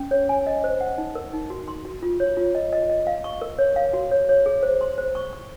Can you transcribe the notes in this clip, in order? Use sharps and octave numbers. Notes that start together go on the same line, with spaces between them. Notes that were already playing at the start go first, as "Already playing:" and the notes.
Already playing: C#4
C#5
G#5
D#5
C5
F#5
D#4
A#4
D#4
F#4
C6
F#4
F4
C#5
F4
D#5
D#5
D#5
F5
C#6
A#4
C#5
F5
F#4
C#5
C#5
G#4
C5
C6
C5
C#6
C#6